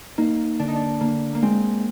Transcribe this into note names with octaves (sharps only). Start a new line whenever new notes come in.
A#3 D#4
D3 D4
D#4
D4
D3 A#3
A#3
G#3 C4